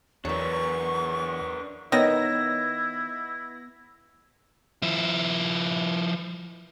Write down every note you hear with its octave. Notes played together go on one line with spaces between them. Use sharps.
E2 F#3 B3 D4 A#4 C#6
D#3 B3 E4 C#5 D#5 E5 A#6
F3 E4